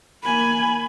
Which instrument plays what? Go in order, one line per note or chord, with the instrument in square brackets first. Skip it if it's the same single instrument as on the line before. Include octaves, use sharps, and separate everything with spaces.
[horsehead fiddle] A#3 G#5 [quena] B5